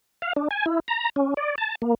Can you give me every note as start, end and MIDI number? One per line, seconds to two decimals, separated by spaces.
0.22 0.33 77
0.36 0.48 62
0.51 0.66 80
0.66 0.80 64
0.88 1.09 82
1.16 1.34 61
1.37 1.55 74
1.58 1.75 81
1.82 1.95 58